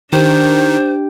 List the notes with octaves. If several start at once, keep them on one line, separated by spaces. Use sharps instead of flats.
D#3 D4 G4 C5